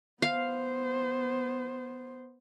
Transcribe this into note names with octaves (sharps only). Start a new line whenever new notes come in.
B3 C5 F5